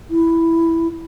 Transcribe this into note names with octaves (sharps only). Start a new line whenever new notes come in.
E4